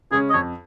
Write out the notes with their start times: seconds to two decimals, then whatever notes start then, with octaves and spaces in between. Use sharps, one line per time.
0.11 C#3 G#3 C#4 G#4
0.30 D#5
0.33 F2 C#5